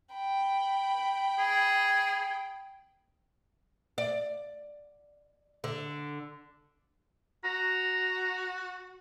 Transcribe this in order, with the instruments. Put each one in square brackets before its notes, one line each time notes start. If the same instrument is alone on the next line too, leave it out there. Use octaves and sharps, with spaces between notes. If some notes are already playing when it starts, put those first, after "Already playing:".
[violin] G5 B5
[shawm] G#4
[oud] D5
D3
[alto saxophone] F#4 [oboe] A#5